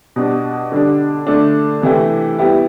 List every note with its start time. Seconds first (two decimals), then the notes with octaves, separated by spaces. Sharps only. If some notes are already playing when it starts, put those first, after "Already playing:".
0.16 B2 G3 D4
0.72 D3 G3 D4
1.27 D3 A3 D4
1.82 C3 E3 A3 E4 G4
2.38 G3 B3 E4 G4